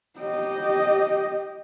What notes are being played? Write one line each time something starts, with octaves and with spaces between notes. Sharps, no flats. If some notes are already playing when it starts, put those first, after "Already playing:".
G4 D#5